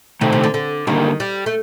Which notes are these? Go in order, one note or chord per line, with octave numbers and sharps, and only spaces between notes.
C3 D#3 A3 D#4 A4 C5
C3
D3
D3
G2 D3 D#3 G3 A#3
G3
A3